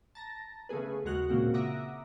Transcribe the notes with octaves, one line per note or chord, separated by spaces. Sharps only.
A5 A#5 A#6
C#3 A3 B3 G#4 B4
D#2 G#3 F#4 F6 F#6
A#2 C#3 A#3 C4 F#4
E5 F#5 A#5 D6 D#6 A#6